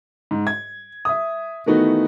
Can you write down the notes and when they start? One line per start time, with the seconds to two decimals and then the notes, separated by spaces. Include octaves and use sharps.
0.31 G#2
0.47 G#6
1.05 E5 D#6
1.66 D#3 E3 A3 B3 D#4 F#4